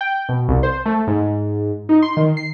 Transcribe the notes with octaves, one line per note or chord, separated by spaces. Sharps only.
G5
B2
C2
C5
A3
G#2
D#4
C6
D#3
C7